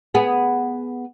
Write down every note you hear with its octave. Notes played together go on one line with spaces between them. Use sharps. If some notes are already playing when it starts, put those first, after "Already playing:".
B3 G#4